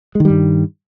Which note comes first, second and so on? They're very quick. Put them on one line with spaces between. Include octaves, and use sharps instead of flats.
G#3 D#3 G3 G2